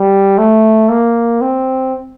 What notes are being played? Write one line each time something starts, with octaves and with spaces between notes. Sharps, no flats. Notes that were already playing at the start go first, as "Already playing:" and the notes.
Already playing: G3
A3
A#3
C4